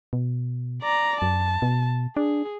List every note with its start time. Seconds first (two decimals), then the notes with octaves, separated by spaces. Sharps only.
0.13 B2
0.82 D5 A#5
1.22 F#2 A5
1.62 B2
2.17 D4 G#4